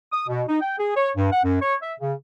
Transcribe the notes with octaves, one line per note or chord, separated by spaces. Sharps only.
D#6
B2
D#4
G5
G#4
C#5
G2
F#5
F#2
C#5
E5
C#3